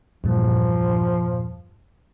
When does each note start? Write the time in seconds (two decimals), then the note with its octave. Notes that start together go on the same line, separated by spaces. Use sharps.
0.24 E2 G2 A#2 F3